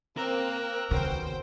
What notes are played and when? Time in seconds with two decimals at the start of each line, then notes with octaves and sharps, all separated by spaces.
0.17 A#3 C4 A#4 E6 F#6
0.91 D#2 C#3 B3 F#4 C5 G5